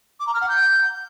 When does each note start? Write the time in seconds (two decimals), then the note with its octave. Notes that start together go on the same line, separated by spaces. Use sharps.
0.19 D6
0.27 A#5
0.34 F6
0.41 F#5
0.48 G6